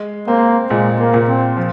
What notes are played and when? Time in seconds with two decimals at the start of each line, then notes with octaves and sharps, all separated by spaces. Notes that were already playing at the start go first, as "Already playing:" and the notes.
Already playing: G#3
0.27 A#3 C4
0.70 A#2 G#3
0.99 A#3
1.14 A#2
1.28 C4
1.57 F3